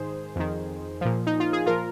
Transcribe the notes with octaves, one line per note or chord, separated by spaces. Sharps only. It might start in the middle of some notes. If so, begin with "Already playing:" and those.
Already playing: G#2 D#3 G#4 C5
F2 D#3
A#2 F3
D#4
F4
G#4
A#2 F3 F4 A#4